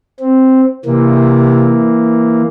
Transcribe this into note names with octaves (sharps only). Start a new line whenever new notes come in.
C4
C3 E3 A#3